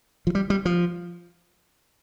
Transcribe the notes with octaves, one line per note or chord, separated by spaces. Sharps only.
F3
G3
G3
F3